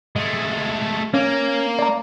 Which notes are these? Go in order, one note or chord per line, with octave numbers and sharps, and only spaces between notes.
G#3 A3
A#3 C#4
D5 A#5